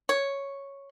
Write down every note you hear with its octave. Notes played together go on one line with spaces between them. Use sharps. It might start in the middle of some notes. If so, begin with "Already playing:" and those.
C#5